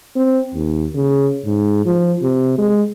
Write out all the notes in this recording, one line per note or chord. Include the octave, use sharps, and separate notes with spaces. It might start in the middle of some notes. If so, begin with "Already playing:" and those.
C4
D#2
C#3
G#2
F3
C3
G#3